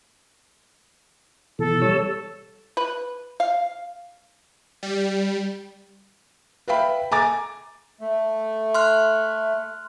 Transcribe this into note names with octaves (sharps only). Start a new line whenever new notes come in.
B2 E3 A4
G3 C#5 E6
B4
F5
G3
B4 E5 F5 G5 B5
G#5 A#5 D6 A6
A3
C6 F6 F#6